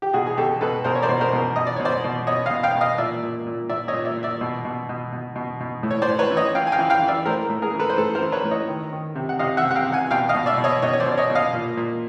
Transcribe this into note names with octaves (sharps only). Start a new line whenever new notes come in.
G4
B2 F#4 G#4
G#4
B2 G4 A4
B2 A4 B4
B2 A#4 C5
C#5
C5 D5
B2
A#4 C5
B2
B2 D#5
D5
B2 C#5
C5 D5
B2
B2 C#5 D#5
D#5 F5
B2
F5 G5
B2
D#5 F5
A#2 D5 E5
A#2
A#2
A#2 D5 E5
C#5 D#5
A#2
D5 E5
A#2
D5 E5
B2
B2
B2
B2
B2
B2
A2
C#5
C5 D5
A2
B4 C#5
E3
C#5 D#5
E3 F5 G5
G#5
F5 G5
E3
F5 G5
E3
D5 E5
A2 A#4 C5
A2
G#4 A#4
E3
A4 B4
C5
A2 A4 B4
A#4 C5
E3
B4 C#5
A2
C#5 D#5
D#3
D#3
C3
F#5
C3 D#5 F5
E5 F#5
C3
F#5
F5 G5
C3
F#5 G#5
B2 F5 G5
D#5 F5
B2
D5 E5
B2
C#5 D#5
B2 C#5 D#5
C#5
C5 D5
B2
D5
C#5 D#5
B2
D#5 F5
A#2
A#2